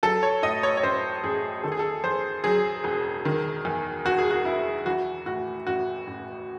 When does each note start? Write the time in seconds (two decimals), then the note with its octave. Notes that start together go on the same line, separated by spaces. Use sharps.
0.03 F#3 A4
0.23 C#5
0.42 A2 D#5
0.63 C#5
0.77 C#5
0.83 A1 C5
1.23 A1 G#4
1.63 D#3 A4
1.72 G#4
1.79 A4
2.04 E2 C5
2.44 F#3 G#4
2.84 E1
3.25 D#3
3.65 E2
4.05 E1 F#4
4.18 G#4
4.31 F#4
4.45 E1 E4
4.86 E3 F#4
5.26 A2 F#4
5.67 A1 F#4
6.07 A1